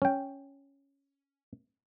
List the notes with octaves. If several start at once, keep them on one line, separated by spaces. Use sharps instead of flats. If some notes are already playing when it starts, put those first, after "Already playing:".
C#4 G5